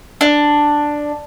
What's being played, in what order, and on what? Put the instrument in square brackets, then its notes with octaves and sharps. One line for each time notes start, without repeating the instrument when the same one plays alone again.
[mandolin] D4